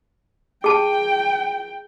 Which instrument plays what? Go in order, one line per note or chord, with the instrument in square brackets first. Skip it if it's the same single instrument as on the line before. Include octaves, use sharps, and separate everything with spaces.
[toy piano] G#4 A5 [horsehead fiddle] G5